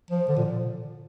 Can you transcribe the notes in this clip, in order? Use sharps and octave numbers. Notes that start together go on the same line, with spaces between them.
F3
D3
A#2